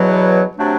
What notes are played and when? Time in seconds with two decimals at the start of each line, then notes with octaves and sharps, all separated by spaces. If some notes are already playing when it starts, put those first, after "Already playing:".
Already playing: E2 B2 F#3
0.58 C3 F#3 A3 D4